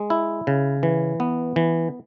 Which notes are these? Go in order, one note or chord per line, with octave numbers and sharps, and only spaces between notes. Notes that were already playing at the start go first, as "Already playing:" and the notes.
Already playing: G#3
E4
C#3
E3
B3
E3